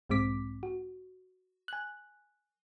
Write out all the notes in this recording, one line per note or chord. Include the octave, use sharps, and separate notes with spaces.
B1 G#2 G#3 C4 D6 B6
F#4
G#5 F#6